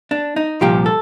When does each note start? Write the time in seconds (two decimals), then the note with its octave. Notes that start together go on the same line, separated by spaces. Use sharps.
0.11 D4
0.36 D#4
0.61 C2 A#2 F3 G4
0.86 A4